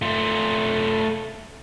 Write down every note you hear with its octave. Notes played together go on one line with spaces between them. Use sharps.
A3 F4